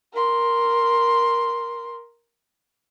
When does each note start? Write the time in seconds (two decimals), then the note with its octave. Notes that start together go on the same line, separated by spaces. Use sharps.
0.13 A#4 C6